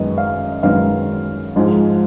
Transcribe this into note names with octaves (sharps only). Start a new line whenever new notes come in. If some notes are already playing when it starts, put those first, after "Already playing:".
Already playing: F#2 D#3 G#3 B3 D#5
F5
F#2 D#3 G#3 B3 F5
G#2 F3 G#3